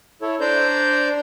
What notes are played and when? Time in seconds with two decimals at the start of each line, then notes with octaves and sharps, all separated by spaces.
0.22 E4 A4 C#5
0.40 D4 C5 D5 A#5 G6